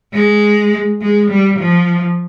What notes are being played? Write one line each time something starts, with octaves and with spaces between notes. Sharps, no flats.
G#3
G#3
G3
F3